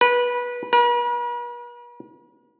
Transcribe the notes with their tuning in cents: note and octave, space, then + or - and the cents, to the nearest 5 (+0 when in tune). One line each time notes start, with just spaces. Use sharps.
B4 -20
B4 -45